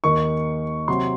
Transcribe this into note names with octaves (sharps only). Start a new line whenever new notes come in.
D#2 D#3 A#3 D#4 C#6
C3 F#3 C4 C6